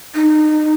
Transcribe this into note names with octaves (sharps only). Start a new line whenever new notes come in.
D#4